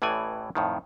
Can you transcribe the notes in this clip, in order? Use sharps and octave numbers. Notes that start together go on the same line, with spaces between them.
A1 A2 E3 D5 G#5
F2 A2 D#3